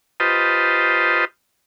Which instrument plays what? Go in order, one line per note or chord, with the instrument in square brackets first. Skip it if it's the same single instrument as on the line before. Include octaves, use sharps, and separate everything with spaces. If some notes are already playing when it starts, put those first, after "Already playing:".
[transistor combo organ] F4 G4 B4 C5 D#5 A5